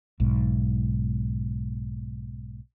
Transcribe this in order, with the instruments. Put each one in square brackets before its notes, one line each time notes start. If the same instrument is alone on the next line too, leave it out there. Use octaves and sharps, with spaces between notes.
[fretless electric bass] B1 G#2